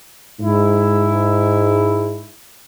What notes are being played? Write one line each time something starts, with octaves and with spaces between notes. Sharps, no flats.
G#2 E4